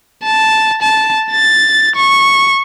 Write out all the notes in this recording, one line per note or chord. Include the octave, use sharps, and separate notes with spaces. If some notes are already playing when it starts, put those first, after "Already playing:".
A5
A5
A6
C#6